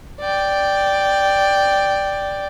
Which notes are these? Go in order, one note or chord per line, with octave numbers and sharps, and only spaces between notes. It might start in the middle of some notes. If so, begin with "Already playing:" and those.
D5 G5